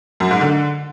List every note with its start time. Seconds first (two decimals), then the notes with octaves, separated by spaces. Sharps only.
0.20 F#2
0.31 G#2
0.41 D3